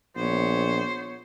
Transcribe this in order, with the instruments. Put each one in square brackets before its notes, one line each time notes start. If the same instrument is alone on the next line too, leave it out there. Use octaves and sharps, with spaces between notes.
[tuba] A#1 [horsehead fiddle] B3 C#5 [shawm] C5